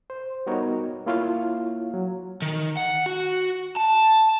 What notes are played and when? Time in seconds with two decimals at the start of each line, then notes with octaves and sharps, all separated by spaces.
0.10 C5
0.47 G3 B3 D#4 F#4 A#4 C#5
1.06 A#3 E4 F4 C#5 F5
1.94 F#3
2.42 D#3
2.77 F#5
3.06 F#4
3.76 A5